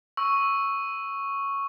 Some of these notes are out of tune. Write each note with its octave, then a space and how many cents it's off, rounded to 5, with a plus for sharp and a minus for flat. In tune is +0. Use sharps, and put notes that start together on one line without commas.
C#6 +0 E6 +0